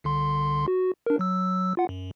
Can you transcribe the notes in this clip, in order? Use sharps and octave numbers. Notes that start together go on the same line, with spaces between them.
C2 D3 C6
F#4
D4 A#4
F#3 E6
F4 F#5
F#2